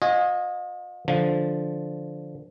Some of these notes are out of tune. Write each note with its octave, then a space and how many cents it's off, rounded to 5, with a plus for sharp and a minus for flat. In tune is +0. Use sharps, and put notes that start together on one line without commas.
F4 +45 D#5 +0 G#5 -5
D3 +0 F3 +0